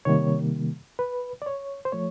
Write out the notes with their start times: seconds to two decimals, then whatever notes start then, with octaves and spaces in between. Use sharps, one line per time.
0.05 C3 D#3 G3 A#3 C#5
0.99 B4
1.42 D5
1.46 C#5
1.85 C5
1.92 F3 A3 C#5